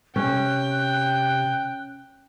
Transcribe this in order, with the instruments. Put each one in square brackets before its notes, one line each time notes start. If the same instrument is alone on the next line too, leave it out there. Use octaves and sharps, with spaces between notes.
[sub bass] C3 [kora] C#4 [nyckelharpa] G5 [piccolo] F#6